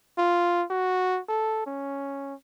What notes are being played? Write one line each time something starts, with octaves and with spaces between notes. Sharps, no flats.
F4
F#4
A4
C#4